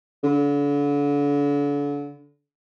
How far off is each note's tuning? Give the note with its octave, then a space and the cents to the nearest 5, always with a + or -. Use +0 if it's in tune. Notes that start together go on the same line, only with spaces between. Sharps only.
D3 -35